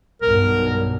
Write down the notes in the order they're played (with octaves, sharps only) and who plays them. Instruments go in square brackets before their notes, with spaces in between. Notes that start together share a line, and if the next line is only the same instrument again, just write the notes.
[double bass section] B1 G2 [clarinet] A#4